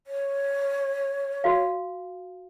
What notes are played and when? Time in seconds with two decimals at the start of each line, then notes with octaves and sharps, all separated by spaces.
0.07 C#5
1.44 F#4 F5